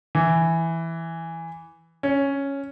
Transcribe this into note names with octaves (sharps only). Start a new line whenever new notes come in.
E3
C#4